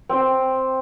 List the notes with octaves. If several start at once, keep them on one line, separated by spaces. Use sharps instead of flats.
C4 G5